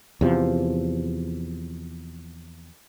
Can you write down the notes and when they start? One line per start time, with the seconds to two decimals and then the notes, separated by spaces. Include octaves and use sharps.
0.21 E2 C3 F3